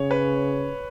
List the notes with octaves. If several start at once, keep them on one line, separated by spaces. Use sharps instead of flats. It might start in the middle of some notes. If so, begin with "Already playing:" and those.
Already playing: C#3 C#5
B4